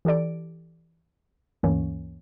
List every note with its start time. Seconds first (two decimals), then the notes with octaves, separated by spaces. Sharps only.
0.05 E3 G4 A4 D5 D7
1.63 D2 G2 E3 A#3 C#4 C#5